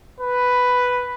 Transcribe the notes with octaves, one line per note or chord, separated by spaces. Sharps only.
B4